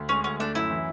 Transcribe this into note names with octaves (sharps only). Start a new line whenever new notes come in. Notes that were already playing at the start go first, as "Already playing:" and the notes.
Already playing: D2
G#3 C#4
D2 C#4
A3 D4
F#2 E4
E3